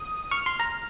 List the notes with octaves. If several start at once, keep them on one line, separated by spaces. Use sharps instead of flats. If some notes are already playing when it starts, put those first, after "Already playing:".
Already playing: D#6
C#6 F6
C6
A#5